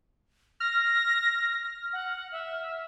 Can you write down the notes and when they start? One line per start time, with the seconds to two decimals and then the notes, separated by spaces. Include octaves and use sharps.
0.60 F6 A#6
1.93 F#5
2.32 E5